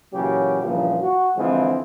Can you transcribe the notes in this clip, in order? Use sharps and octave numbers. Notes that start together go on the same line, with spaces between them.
A#2 C#3 E3 F#3 F#4 G4
G2 A#2 C#3 E3 F3
F#4
D3 E3 F3 G#3 C4